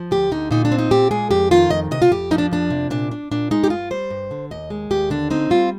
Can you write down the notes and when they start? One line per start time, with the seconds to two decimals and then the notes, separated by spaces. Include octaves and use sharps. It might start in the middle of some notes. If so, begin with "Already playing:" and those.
Already playing: F3
0.11 D2 G4
0.31 D3 D#4
0.51 A#2 D#4
0.65 D4
0.72 C4
0.78 D#4
0.91 A#2 G4
1.11 G#3 G#4
1.31 F2 G4
1.51 D#3 F4
1.70 F2 D#5
1.91 C3 D#5
2.02 F4
2.11 F2 G4
2.31 F3 D#4
2.38 D4
2.51 F2 D4
2.70 C3
2.90 A#2 D4
3.11 D4
3.31 A#2 D4
3.51 G#3 D#4
3.64 G4
3.70 G2 F4
3.90 G3 C5
4.10 G2
4.31 D3
4.51 D#2 D#5
4.70 G#3
4.90 D#2 G4
5.10 D3 D4
5.30 C4 D#4
5.50 G3 F4